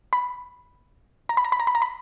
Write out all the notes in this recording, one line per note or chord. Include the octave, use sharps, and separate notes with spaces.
B5
A#5
B5
A#5
B5
A#5
B5
A#5
B5